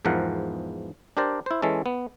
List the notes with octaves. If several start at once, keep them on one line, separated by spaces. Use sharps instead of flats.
E2 G#2 E3 F3 A#4 F#5
D4 G4 A#4 C5 D5
E4 C5
E3 G#3 C#4 A4
B3